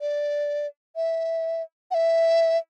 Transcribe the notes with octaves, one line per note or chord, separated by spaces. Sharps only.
D5
E5
F#5
E5